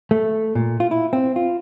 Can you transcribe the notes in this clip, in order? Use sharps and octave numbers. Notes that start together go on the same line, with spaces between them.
A3
A#2
F4
E4
C4
F4